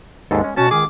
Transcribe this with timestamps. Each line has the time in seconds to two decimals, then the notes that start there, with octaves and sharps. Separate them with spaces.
0.31 D#2 G#2 G#3 A4
0.44 C#4
0.57 B2 C#4 F#4 A5
0.71 C#2 D#3 C#4 G#4 D6